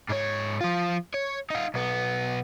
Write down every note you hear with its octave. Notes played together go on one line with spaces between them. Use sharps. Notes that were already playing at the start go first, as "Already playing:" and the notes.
G#2 C#5
F3 F4
C#5
D#4 F4
B1 B3